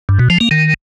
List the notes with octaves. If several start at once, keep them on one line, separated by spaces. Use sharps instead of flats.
G2
B2
F3
A#3
D#3